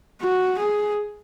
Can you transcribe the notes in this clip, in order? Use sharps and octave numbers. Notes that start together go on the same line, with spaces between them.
F#4
G#4